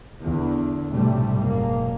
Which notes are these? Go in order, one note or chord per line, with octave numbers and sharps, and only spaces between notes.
E2 D3
B1 A2 C3 G3 A3
F#1 G#2 B2 A#3